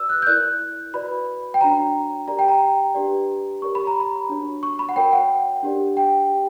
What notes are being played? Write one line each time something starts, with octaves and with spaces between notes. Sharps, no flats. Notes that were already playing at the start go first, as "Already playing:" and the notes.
Already playing: F#4 B4 D5 E6
F#6
G6
E4 A#4 D5 F#6
F#4 B4 D5 B5
G5
D4 F#4 C#5 A#5
G4 A#4 D5 A#5
G5
A#5
D4 G4 B4 D5
G4 A#4 C#5 C#6
B5
A#5
B5
D4 F#4 C#5
C#6
B5
F#5
F#4 A#4 C#5 G5
F#5
D4 G4 A#4 D5
G5
G4